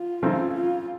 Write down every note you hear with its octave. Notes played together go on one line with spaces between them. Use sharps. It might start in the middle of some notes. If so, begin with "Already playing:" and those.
Already playing: F4
C#3 E3 A3 C4 D#4
F4